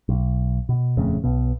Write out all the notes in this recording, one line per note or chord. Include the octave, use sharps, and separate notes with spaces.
B1
B2
D#1 F2 C#3 A3
B1 B2